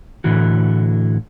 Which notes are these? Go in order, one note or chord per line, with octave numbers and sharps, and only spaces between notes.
A2 D3 E3 F#4